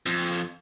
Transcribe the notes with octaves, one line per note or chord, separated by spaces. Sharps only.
F2